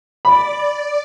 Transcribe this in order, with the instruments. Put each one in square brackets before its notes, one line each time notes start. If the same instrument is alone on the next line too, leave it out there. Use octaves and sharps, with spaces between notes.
[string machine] D5 [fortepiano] B5